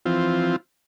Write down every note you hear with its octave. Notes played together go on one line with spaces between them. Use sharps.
E3 F3 C4 F4